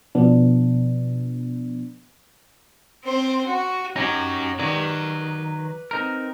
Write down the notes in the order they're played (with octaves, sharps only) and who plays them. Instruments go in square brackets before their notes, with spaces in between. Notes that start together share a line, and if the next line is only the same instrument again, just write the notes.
[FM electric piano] B2 F3 B3 D4
[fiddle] C4 C5
F#4
[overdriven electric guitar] C#4 F#4 [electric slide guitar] D#4 G4
[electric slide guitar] D#3 F#3 [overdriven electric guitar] B4 D5
[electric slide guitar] C4 D#4 A#4